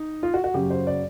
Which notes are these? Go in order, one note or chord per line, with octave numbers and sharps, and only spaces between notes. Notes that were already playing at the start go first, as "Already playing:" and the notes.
Already playing: D#4
F4
F#4
F#4
F#2 C#3 F#3 G4
C5
D5